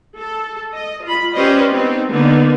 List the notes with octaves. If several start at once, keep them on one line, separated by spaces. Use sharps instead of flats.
A4
D#5
F4 B5
C#4 G4 B4 C5 D5 D#5
B3 C4 D#4
D3 A#3 B3 D#4